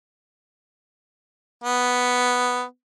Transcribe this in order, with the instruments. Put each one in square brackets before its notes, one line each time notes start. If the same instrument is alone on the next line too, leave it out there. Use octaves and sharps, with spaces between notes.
[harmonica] B3